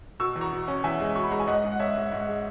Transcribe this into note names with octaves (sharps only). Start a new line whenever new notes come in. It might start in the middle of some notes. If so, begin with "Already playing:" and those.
B2 C#6 E6
E2
A#5 C#6
B2
C#4
E2 E5 G#5
G#3
B2 C#6
B5
G#3 A#5
G#5
G#2 D#5 F#5
G#2
F#5
G#2 C#5 E5
G#2
G#2
G#3